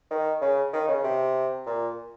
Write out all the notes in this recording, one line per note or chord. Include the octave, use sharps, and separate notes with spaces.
D#3
C#3
D#3
C#3
C3
A#2